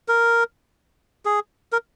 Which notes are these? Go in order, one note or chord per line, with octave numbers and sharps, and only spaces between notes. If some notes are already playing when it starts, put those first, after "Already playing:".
A#4
G#4
A#4